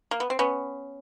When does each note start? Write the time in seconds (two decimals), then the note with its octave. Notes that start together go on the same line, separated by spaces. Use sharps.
0.11 A#3
0.20 B3
0.30 C4
0.39 B3 C#4